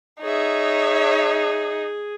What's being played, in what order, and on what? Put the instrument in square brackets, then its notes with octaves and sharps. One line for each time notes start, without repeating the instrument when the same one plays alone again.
[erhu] D#4 [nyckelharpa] G#4 [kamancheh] C#5 E5